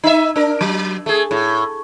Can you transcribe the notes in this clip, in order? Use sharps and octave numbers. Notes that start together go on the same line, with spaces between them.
D#4 E5
D4 A#4
F#3
A3 G#4
A2